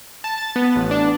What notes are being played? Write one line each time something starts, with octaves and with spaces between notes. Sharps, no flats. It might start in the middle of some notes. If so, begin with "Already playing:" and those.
A5
A6
B3
A1
D4